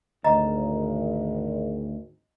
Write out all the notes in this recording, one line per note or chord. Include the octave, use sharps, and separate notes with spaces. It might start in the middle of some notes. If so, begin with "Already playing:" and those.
G#1 D2 D#5 A#5